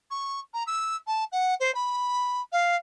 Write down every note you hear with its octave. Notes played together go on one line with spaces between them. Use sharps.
C#6
A#5
E6
A5
F#5
C5
B5
F5